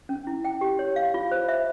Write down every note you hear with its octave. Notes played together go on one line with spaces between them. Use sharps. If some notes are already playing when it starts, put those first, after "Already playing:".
C#4
E4
G5
G4
C#5
F5
F4
C5
E5